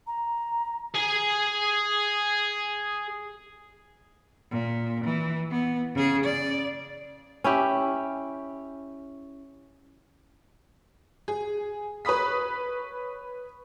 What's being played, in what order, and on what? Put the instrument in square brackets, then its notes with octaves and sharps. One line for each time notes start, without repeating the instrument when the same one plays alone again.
[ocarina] A#5
[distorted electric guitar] G#4 G#5
[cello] A#2
E3
B3
C#3 G#4
D5
[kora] C#4 E4 G4
[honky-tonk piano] G#4
B4 C#5 B5 D#6 B6